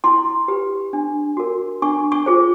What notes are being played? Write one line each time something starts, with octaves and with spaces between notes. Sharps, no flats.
E4 C6
G4 B4
D4
F#4 A#4
D4 C#6
C#6
F4 G#4 C5